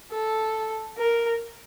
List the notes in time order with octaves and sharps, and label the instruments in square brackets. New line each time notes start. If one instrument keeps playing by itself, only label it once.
[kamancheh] A4
A#4